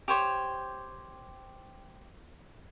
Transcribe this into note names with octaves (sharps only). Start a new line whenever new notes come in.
G4 C5 C#5